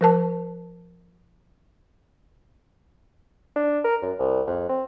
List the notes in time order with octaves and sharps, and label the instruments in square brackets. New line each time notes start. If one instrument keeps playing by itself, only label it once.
[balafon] F3 A#4 A5
[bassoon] D4
A#4
F#2
C2
F2
C4